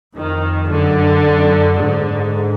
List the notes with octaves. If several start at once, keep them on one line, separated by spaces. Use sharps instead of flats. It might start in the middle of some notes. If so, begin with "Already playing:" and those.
F2 D#3
F#2 D3
F#2
G#2 D3